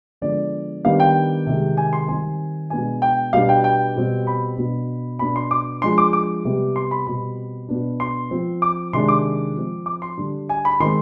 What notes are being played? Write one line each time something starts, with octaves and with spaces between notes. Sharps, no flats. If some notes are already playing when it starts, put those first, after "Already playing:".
D3 F3 G#3 B3 D4 D5
D#3 G3 B3 D4 F5
G5
C3 D#3 G#3
G#5
C6
D#3 G3 C4 G#5
B2 G#3 B3 D4 G#5
G5
B2 G3 B3 D4 F5
G5
G5
B2 G3 C4
B5
B2 B3 D4
B2 B3 D4 B5
C6
D6
F3 G#3 D4 C6
D6
D6
C3 G3 B3
C6
B5
B2 G3 C4 B5
B2 B3 D4
C6
F3 C4
D6
C3 D#3 G#3 D4 C6
D6
F3 C4
D6
C6
D3 G3 D4
G#5
B5
D#3 G#3 C4 C6